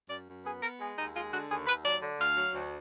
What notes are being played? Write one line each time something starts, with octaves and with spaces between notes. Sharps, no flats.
F#2 D5
F#2
B3 G#4
B3 A#4
G#3 G#4
D#2 D#4
G#3 F4
D3 F#4
D#2 G#4
D#2 B4
F#3 D5
D3
D2 F5
F#3
D2